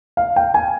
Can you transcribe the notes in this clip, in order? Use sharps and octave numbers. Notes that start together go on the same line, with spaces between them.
F5
G5
G#5